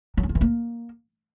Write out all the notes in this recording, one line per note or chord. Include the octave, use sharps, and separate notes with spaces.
F#3
C#4
F4
E3
A#3